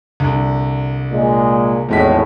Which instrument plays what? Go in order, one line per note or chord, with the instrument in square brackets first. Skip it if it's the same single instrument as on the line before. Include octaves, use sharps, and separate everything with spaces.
[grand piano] C2 D3
[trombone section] A#2 G#3
[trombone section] G#1 A2 [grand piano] E2 G#3 B6